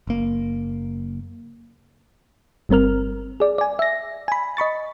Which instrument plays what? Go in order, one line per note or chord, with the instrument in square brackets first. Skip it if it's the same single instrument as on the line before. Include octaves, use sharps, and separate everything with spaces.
[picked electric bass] F#1 A#3
[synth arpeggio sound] G1 G3 C4 A#4 F6
G#4 D5
D5 G#5
E5 A#6
G#5 B5
D#5 B5 C#6 A6